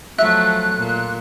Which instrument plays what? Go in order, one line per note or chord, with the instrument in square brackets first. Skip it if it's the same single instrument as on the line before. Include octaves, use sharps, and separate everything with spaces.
[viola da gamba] F3 F#3 A3 [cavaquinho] E5 [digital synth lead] F#6
[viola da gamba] A#2